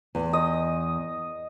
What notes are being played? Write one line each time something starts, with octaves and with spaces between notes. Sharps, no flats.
E2
D#5